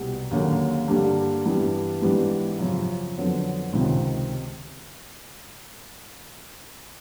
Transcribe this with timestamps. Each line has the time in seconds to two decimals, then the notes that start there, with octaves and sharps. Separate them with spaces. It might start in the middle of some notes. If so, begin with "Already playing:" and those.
Already playing: C2 B2 G3
0.31 D#2 D3 F#3 A#3 C#4
0.88 G2 D3 G3 A#3 D4
1.46 G2 E3 G3 B3
2.02 G#2 E3 G3 B3 D4
2.59 F#2 C#3 F3
3.17 F2 D3 F#3 B3
3.73 C#2 C3 D#3